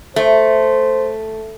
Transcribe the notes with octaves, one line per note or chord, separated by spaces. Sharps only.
A3 C5